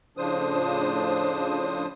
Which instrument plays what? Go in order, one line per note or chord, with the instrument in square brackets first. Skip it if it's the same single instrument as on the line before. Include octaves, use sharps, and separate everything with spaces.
[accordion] A2 C#3 F3 D4 C5 D#6